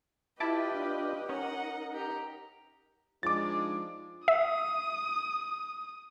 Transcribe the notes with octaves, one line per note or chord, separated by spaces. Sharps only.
E4 F4 G4 B4 D#5 A5 D6
D4 F4
C#4 D#4 A#4 D#5 F#5
G4 A#5
F3 G#3 D4 D#4 D6 A6
E5 D#6